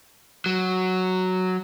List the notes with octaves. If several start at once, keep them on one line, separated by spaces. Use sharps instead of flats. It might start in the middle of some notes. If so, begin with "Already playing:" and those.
F#3